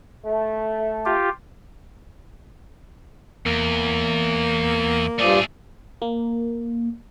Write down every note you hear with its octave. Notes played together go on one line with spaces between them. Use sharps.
A3
F4 G4
E2 A#3
G2 F3 A3 G#4 D5
A#3